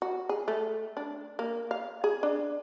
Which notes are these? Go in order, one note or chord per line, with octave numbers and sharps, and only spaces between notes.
F#4
G#4
A3
D4
A#3
F5
G#4
D4